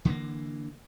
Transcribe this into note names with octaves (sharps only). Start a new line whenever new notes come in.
D3 E3 G#3 A#3